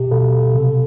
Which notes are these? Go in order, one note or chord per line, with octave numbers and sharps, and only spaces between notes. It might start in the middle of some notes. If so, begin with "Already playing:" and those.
Already playing: B2 G4
B2 A4
C3